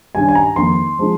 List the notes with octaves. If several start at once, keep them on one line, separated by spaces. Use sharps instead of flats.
G2 D#3 G3 C#4 G#5
G#5
A#5
F2 D#3 A#3 D#4 C6
F3 G#3 C4 D#4